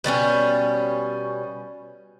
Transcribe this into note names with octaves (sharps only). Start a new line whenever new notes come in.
B2 G3 A3 C#4